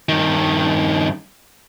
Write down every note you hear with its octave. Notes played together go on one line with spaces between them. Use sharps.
G2 D#3